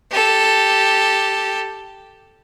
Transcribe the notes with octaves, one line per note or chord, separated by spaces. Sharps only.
G4 A4